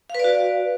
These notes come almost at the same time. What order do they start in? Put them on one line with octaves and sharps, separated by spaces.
F5 B4 D5 F#4